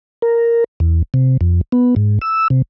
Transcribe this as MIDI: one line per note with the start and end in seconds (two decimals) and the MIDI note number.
0.22 0.64 70
0.80 1.02 40
1.14 1.37 48
1.41 1.61 41
1.72 1.95 59
1.96 2.19 44
2.21 2.48 88
2.50 2.62 48